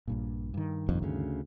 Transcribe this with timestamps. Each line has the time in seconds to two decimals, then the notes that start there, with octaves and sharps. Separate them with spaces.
0.08 A#1 G2 A#2
0.54 G2 D#3
0.89 F1 A#1 F2
1.03 D2 C#3